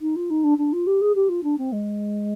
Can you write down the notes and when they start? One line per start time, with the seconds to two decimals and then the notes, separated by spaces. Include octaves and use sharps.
0.01 D#4
0.16 F4
0.30 D#4
0.43 D4
0.58 D4
0.72 F4
0.86 G4
1.01 G#4
1.15 G4
1.29 F4
1.43 D4
1.58 C4
1.72 G#3